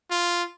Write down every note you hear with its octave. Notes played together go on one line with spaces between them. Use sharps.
F4